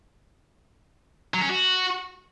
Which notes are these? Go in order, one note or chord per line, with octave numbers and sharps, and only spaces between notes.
F#3
C#4
F#4